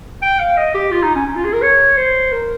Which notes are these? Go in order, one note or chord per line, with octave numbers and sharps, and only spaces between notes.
G5
F5
D#5
G4
F4
D#4
C#4
C#4
F4
G#4
A#4
C#5
C5
A#4